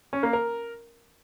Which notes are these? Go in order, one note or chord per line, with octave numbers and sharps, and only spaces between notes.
C#4
A#3
A#4